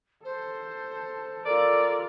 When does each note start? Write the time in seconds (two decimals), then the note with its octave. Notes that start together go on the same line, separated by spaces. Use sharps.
0.24 A4 C5
1.45 F4 A4 A#4 D5